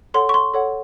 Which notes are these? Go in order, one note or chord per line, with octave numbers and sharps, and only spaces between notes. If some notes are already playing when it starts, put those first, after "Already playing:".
A4 C#5 F#5 C6
C#6
C6
A4 C#5 F#5